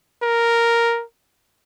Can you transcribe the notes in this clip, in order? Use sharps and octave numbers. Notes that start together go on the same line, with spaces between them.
A#4